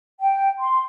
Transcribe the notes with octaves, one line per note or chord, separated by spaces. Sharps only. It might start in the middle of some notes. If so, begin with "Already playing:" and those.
G5
C6